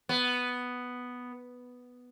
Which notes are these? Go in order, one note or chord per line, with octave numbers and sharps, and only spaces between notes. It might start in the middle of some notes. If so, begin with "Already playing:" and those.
B3